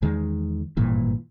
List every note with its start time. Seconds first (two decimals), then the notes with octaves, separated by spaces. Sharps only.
0.02 E2 D#3 G#3
0.77 G#1 G2 A#2 E3